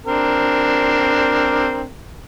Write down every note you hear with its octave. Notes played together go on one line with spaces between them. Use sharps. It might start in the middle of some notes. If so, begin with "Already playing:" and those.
C4 D4 A#4